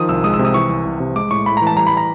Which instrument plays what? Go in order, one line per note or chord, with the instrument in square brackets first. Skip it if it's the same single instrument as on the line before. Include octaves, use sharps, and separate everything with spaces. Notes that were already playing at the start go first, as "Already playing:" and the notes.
Already playing: [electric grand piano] D#3 F3 D#6
C2 E6
G#3 D#6
E6
C3
D#6
E3 C#6
C2
C2
C3
G#3 D6
A2 C#6
A2 B5
A#5
E3 A5
G3 A#5
B5
A#5